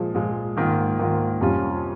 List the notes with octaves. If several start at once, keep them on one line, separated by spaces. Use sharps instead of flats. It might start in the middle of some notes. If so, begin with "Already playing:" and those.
Already playing: A#2 F3 G#3
A#2 F3 G#3
G#2 D#3 A#3 F4
G#2 D#3 A#3 F4
F2 C3 G3 C#4 F4